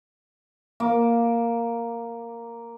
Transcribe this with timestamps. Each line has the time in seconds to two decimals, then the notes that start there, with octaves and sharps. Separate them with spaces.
0.80 A#3 D6